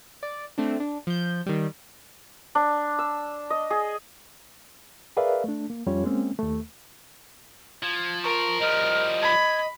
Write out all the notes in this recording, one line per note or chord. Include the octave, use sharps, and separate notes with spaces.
D5
A3 C4 D4
D4
F3 G6
D#3 G3
D4
E6
D#5
G#4
G#4 A#4 B4 D5 E5 F5
A3 D4
A#3
F2 G3 C#4 F4 C#5
G#3 A#3 C4 C#4
D#2 A3
F3 G#6
A#4 C#6
F3 G3 D#5 F6
B5 G#6